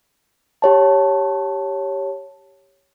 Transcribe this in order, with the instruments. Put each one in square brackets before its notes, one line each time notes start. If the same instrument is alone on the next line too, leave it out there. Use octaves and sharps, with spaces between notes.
[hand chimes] G4 C#5 A5